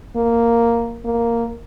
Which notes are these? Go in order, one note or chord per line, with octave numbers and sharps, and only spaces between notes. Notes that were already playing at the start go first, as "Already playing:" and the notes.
A#3
A#3